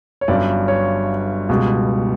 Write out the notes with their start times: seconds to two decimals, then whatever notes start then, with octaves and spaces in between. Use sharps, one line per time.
0.21 C#5
0.28 G1 G2 F#3 C#4 D5
0.68 C#5
1.49 C#2 B2 G3